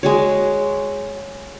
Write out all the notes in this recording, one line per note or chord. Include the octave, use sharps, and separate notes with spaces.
G#3 F#4 C#5